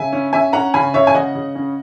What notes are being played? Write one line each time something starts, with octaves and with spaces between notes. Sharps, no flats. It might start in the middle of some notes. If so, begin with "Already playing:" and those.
Already playing: C#3 E5 G#5
C#4
C#4 E5 G#5
C#4 F#5 A#5
C#3 G#5 B5
C#3 C#5 E5
G#5
C#3 D#5 F#5
C#3
C#4